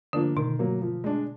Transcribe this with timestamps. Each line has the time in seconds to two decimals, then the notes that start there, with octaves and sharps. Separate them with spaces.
0.13 D3 F3 A#3 D4
0.36 B2 D#3
0.59 F#3 A#3
0.81 F3
1.04 G#3 D4